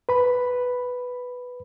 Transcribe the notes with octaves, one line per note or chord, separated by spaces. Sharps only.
B4 B5